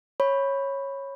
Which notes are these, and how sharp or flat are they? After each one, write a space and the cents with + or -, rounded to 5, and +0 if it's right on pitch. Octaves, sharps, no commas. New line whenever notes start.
C#5 -10 B5 +0